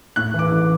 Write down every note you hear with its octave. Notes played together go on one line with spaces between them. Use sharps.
A2 F#6
E3
D6
A1